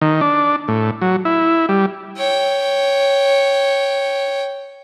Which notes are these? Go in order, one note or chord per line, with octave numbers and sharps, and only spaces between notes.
D#3
D4
A2
F#3
E4
G3
C#5 G5